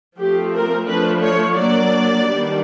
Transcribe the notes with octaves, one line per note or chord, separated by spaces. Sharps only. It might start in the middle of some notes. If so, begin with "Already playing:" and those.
F3 A3 C4 G4
A#4
F3 A3 D4 B4
C#5
F#3 A#3 D4 D5
D#3 G3 B3 D4